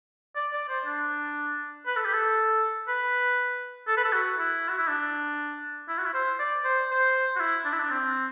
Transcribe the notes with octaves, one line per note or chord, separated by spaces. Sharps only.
D5
D5
C5
D4
B4
A4
G4
A4
B4
A4
B4
A4
F#4
E4
F#4
E4
D4
E4
F#4
E4
C5
D5
C5
C5
F#4
E4
D4
E4
D4
C4